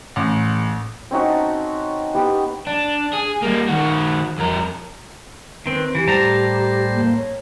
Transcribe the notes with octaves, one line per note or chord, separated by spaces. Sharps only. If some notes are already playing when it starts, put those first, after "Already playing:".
A1
C4 C#4 D#4 F#4
A5
B3 G4
D4
G#4
G3 A#3
D#3 F#4
F2 A#4
D#3 C4 B4
E3 G4
A2 G3 C5 A5 A#5
A#3
C#5